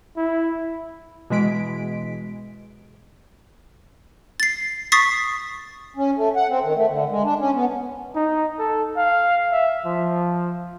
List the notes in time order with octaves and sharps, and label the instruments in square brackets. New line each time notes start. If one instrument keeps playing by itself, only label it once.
[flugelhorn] E4
[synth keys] B2 E3 G#3 B6 D7
[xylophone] A6 C7
C#6 D#6 A6 B6 C7
[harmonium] C#4
A3
F#5
C4
D#3
A3
D3
G#3
D4
C#4
B3
[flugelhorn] D#4
A4
F5
E5
F3